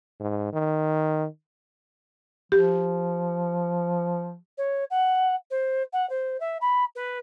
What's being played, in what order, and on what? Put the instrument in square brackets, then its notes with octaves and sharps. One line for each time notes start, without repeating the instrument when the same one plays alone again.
[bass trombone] G#2
D#3
[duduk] F3 [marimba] G4
[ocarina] C#5
F#5
C5
F#5
C5
E5
B5
B4